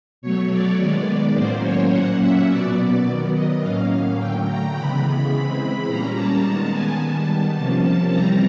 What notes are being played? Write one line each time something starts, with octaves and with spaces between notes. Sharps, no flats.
B2 F#3 A3 C#5
D5
D#3 G#3 B3 D5
D5
A2 F#3 A#3 C#4 C5
C#5
A#2 F#3 A#3 C#4 F#5
E5
B2 F#3 B3 D5
D#3 F#3 B3
D#5
A2 F#3 A#3 C#4 F5
D3 F#3 A3 G5
A#5
C#3 E3 G#3 B3 B5
E3 G#3 C4
A#2 G3 A#3 C#4 A#5
A5
D#3 G#3 B3
G#5
D#3 G3 B3 A5
C3 F3 A#3 C#4 A5
A5
E3 G3 C4 A#5